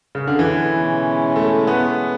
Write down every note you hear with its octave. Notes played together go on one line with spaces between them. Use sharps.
C#3
D3
B2 E3 G#3 C#4 E4
A3
B3